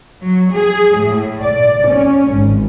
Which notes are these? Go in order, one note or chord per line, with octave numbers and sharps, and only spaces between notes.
F#3
G#4
A2
D5
C#4
G#1